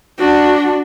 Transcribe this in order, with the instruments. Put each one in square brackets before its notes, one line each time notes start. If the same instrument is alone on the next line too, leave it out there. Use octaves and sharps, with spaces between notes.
[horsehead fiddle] D4 F#4